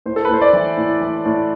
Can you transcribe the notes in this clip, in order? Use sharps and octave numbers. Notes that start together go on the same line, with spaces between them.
A2 C5
A4
B4
A2 C5
D5
E3
A2
E3
A2